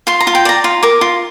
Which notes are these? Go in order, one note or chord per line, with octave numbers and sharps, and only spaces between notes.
F4 C6
A#5
F4
G5
D5 A#5
F4
A#4 D6
F4